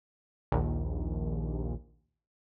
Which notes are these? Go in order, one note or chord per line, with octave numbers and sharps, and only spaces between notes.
A#1 D#2